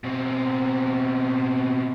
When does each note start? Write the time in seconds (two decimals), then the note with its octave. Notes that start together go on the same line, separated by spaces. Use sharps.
0.04 B2 C4